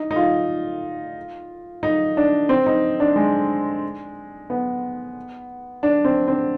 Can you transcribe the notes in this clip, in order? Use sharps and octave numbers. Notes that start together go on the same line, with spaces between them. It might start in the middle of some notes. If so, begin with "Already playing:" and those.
Already playing: D#4
D#4
F4
D#4
D4
C4
D#4
D4
G#3
B3
D4
C4
C4